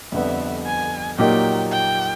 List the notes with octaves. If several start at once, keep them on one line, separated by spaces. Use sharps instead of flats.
F2 D3 G3 B3 E5
G#5
A#2 F#3 A#3 D#4 G4 G5
G5